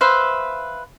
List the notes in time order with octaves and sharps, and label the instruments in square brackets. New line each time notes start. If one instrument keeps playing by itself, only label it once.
[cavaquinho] B4 C5 E5 F5